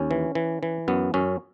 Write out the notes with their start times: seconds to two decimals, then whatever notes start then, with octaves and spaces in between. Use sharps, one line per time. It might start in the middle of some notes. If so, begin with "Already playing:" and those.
Already playing: D#2 C#4
0.11 E3
0.35 E3
0.63 E3
0.88 F#2 B3
1.14 F#2 C#4